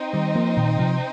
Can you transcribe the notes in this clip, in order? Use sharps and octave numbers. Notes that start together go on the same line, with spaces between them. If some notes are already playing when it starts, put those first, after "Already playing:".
Already playing: C4 D#4 C5 D#5 G5
D#3 G3
F3 A#3
A#2 D#3
C3 F3